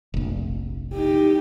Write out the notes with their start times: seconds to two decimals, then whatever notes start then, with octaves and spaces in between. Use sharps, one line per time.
0.14 F1 A#1
0.94 D#4 G4